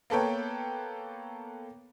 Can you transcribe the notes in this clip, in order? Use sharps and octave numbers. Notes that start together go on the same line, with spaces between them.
A#3 B3 A4 B4 C#5 G5